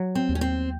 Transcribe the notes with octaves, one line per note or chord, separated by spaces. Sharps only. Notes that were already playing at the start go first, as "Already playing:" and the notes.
Already playing: F#3
C4
D#2
C#4
C4